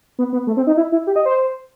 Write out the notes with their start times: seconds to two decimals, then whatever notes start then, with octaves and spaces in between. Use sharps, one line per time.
0.19 B3
0.33 B3
0.47 A3
0.57 C4
0.67 D#4
0.77 E4
0.92 E4
1.07 G4
1.16 D#5
1.25 C5